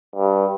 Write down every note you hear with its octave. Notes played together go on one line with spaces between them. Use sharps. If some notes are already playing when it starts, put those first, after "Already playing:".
G2